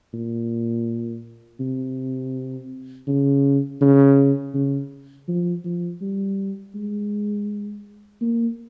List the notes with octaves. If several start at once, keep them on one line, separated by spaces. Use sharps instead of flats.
A#2
C3
C#3
C#3
C#3
F3
F3
G3
G#3
A#3